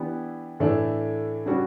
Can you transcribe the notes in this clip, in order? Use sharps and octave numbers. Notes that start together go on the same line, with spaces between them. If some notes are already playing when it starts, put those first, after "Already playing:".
Already playing: E3 B3 D4 G4
A2 E3 A3 D4
C#3 G3 D4 F#4